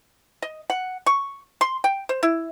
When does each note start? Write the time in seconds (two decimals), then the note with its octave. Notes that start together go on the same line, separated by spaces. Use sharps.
0.42 D#5
0.70 F#5
1.06 C#6
1.61 C6
1.84 G5
2.09 C5
2.23 E4